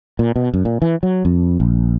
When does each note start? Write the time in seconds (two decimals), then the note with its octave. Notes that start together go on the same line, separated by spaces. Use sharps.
0.19 A#2
0.36 B2
0.54 F#2
0.65 A#2
0.82 E3
1.03 F#3
1.25 F2
1.60 A#1